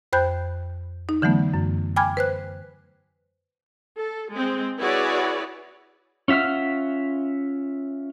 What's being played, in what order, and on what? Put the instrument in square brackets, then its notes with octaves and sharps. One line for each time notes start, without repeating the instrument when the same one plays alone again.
[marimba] F2 C5 G5 B5 F#6 G6
D#4
D3 E3 F#3 A3 B3
F#2
G5 G#5 B5 D6 F6 G#6
B4 C5 F#6
[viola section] A4
G#3 C4
E4 F#4 G#4 B4 C#5 D5
[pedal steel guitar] C#4 F4 E5 F#5 F6